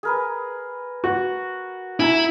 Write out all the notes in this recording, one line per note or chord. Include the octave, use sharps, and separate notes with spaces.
G#4 A#4 B4
F#4
E4 G#5 A#5